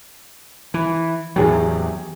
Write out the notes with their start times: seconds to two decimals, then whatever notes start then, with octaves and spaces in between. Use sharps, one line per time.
0.74 E3
1.36 E2 A2 F#3 G4 G#4